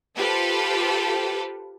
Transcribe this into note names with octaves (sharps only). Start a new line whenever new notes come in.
F4 G4 A4 B4 C5